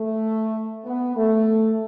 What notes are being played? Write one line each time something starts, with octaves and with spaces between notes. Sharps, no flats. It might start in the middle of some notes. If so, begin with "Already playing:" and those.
Already playing: A3
B3
A3